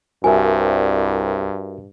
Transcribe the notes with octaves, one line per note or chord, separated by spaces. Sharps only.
C2 G2 F#4 A#4 E5 G#5